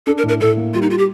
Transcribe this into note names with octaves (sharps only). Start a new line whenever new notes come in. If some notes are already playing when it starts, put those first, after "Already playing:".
D4 A4
A#4
A2
A#4
A2 A4
A#3
G3 F4
D#4
F4
G4